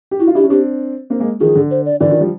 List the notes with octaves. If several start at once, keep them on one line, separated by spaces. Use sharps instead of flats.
G4
E4 F#4
F4
D4 E4 G4
C#4
C4 D4 G4
A#3 C4
G#3 A#3
D#3 F3 G#4
D3
C5
D5
D3 E3 D5
D#3 F3
F3 G3